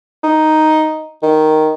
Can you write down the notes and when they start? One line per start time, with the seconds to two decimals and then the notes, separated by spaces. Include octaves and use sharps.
0.24 D#4
1.23 D#3